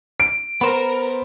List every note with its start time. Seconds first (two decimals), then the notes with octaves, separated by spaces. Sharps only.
0.20 D7
0.61 B3 A#4 C5 B5